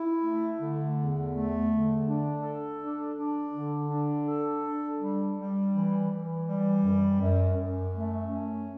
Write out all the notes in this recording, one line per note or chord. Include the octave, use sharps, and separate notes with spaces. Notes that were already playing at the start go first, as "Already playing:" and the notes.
Already playing: E4
A3
D3
E2
A3
D3
D4
A4
D4
D4
D3
D4
A4
D4
G3
G3
E3
E3
G3
F#2
F#2
F#2
A3
C#4